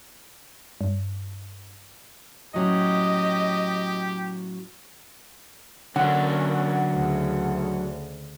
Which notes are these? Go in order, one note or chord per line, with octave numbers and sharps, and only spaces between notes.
G2
A2 F#3 C#4 G4 D#5
D3 F#3 A#3 C#4 D4 F#5
D2 C#3